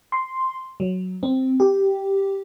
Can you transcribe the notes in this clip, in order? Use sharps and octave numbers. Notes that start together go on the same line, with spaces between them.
C6
F#3
C4
G4